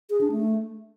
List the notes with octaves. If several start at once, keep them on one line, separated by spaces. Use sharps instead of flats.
G#4
D4
A3